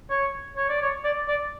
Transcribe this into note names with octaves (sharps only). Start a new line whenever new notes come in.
C#5
C#5
D5
C#5
D5
D5